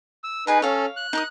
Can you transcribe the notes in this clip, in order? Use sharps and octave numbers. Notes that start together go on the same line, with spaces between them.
E6
D#4 G#4 B4 G#5 A#5
C#4 A4 C#5 F5
F#6
D#4 A#4 D#6